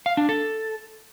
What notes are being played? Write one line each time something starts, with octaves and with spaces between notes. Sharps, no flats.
F5
D4
A4